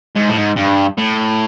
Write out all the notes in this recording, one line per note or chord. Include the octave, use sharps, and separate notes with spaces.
G#2
A2
G#2
G2
A2